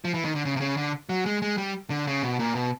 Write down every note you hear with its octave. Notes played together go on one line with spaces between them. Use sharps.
F3
E3
D#3
D3
C#3
C3
C#3
D3
F#3
G#3
G#3
G3
D3
C#3
B2
A#2
B2